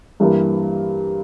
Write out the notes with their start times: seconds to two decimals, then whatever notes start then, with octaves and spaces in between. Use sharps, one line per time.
0.20 G2 E3 G3 A#3